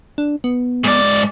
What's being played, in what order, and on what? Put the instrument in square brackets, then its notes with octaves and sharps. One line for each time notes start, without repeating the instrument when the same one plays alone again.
[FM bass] D4
B3
[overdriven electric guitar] G#2 D5